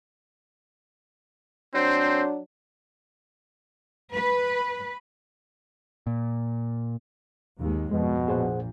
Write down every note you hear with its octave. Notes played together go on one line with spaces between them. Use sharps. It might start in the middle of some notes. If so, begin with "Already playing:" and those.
F#3 C4 D4 C5
B4
A#2
D#2 G#2 G#3
F2 B2 G#3
A#1 A#2 G#4 C5 F#5